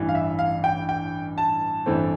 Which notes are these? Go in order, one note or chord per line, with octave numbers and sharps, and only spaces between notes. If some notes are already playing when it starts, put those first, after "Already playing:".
Already playing: A1 G2 E3
F5
E5
F5
G5
G5
A5
A1 G2 E3 A3 C4